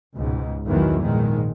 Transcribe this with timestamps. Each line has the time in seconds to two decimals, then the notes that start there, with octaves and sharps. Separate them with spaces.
0.17 C#2 G#2 B2
0.66 B1 E2 A2 D#3 E3 F#3
1.02 A#1 G#2 D#3 G#3